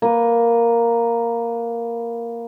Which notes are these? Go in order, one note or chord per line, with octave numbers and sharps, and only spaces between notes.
A#3 B4